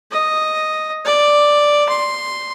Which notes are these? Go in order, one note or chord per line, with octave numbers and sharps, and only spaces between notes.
D#5
D5
C6